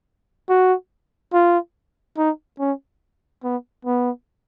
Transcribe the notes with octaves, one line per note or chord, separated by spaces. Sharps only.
F#4
F4
D#4
C#4
B3
B3